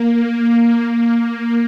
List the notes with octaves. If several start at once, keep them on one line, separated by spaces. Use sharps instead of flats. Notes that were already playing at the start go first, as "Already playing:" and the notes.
Already playing: A#3
A#3